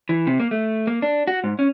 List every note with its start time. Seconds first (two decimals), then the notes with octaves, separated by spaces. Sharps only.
0.09 E3
0.27 C3
0.40 A#3
0.51 A3
0.87 A#3
1.02 D4
1.27 F#4
1.44 G#2
1.59 C#4